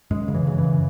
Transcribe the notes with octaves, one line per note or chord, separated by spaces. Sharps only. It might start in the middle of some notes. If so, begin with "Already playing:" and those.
F#2 G#3
C#3
E3
C#3
E3
F#2